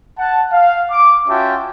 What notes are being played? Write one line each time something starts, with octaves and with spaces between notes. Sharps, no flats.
F#5 A5
F5
D6
C#4 F4 F#4 E5 G5 A5